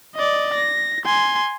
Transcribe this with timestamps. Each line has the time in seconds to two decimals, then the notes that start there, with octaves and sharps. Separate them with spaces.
0.15 D5 D#5
0.54 A#6
1.06 G#5 C6